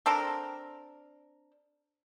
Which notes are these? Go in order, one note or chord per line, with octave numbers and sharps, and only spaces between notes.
C4 D4 A4 A#4